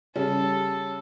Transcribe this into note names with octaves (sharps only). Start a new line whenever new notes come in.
C#3 G3 C#4 A4